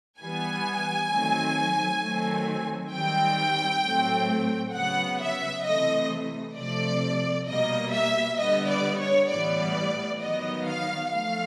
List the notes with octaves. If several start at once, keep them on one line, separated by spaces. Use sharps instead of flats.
E3 G3 B3 G#5
D#3 F#3 A3 C4
D#3 F#3 A3 C4
D#3 G3 C4 G5
A2 F#3 A3 C4
C#3 F#3 B3 F#5
E5
C3 E3 A3 D#5
C3 F3 A3 D5
B2 G3 A#3 D#5
E5
D3 G3 B3 D#5
D5
C#5
A2 E3 G3 B3 D5
D#3 F#3 B3 D#5
F5
F3 A3 F5